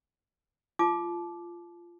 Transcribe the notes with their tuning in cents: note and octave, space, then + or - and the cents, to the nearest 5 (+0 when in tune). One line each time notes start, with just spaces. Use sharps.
F4 -15 A5 -30 D6 +0